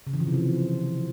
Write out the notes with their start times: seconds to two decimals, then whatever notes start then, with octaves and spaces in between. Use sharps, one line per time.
0.07 C#3
0.13 E3
0.20 F3
0.27 C3
0.34 F3